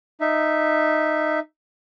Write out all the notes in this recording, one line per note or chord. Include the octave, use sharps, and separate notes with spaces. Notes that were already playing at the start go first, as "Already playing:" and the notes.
D#4 E5